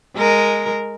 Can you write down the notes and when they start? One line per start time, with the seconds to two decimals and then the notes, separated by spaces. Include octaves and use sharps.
0.16 G#3 A#4